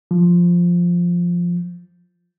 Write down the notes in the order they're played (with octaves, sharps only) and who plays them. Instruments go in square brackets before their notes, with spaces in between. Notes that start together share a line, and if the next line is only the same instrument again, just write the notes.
[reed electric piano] F3